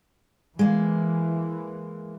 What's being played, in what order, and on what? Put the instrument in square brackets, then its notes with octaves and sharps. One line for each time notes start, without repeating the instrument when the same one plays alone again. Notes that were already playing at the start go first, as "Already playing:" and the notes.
[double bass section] E3 [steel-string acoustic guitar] G#3 A#3